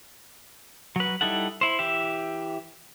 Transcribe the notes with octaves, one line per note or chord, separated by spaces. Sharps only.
F#3 B4
G3 D#4 E4 A4 F#5
E4 C5
E3 G4 E5